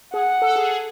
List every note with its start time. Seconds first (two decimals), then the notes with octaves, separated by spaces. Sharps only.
0.14 G#4 F#5
0.42 A4
0.56 G#4
0.71 G#4